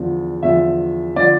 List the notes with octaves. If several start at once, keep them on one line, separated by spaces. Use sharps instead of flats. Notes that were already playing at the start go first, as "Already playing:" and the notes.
Already playing: E2 D3 F3
E2 D3 F3 E5
D3 F3 D5